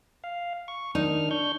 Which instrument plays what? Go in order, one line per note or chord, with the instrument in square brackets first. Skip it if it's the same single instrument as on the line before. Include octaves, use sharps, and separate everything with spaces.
[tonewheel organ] F5
C#6
[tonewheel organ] D#3 D4 F6 [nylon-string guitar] D#4
[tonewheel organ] D4 C#6 G6